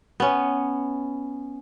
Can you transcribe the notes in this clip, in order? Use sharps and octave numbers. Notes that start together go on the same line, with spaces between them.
B3 C#4